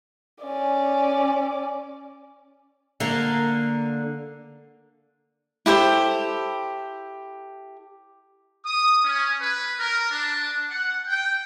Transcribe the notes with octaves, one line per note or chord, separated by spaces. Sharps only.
C#4 D5
D3 A#3
E4 G4 A4 C5
D#6
C#4
B4
A#4
D4
F#5
G5